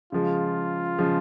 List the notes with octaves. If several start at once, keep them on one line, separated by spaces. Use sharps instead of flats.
C#3 F3 G#3 F4
C#3 F3 G#3